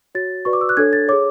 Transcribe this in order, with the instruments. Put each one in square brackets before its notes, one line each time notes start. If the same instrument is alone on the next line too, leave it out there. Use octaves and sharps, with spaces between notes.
[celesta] F#4 C#5 A6
F#4 B4 D5 C#6
D6
E6
F#6
D4 A4 C#5 G#6
A6
C#5 D6
G#4